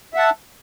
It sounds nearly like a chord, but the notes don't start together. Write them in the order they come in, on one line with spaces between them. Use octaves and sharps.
E5 F#5 A5